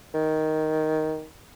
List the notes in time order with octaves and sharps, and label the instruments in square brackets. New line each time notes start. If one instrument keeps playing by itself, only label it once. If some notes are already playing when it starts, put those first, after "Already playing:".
[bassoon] D#3